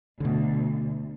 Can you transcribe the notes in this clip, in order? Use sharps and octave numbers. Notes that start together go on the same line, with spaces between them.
D2 B2 D3